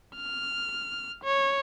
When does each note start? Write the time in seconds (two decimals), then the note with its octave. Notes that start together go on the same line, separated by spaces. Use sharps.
0.16 F6
1.24 C#5